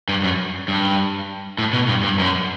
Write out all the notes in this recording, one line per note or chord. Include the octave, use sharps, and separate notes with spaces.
G2
F#2
G2
A2
B2
G2
G2
F#2